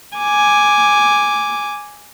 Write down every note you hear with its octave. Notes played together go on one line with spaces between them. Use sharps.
G#5 D6